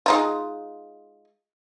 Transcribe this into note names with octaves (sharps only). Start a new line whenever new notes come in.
G#3 D#4 F4